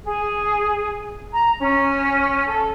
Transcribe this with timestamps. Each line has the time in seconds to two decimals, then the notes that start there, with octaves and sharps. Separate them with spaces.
0.03 G#4
1.32 A#5
1.59 C#4
2.46 A4